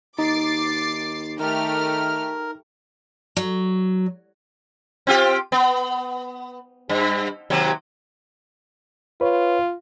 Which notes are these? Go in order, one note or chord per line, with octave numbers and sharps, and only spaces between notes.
D#2 D#4 D6 A6 C7
D#3 A3 G4 A#4 F6
F#3
C4 F4 G4
B3
G2
D#2 C3 F#3
F4 B4 C#5